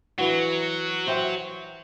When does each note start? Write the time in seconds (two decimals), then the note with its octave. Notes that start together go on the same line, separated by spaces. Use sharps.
0.18 E3 F#3 F#4
1.07 C5 E5 G5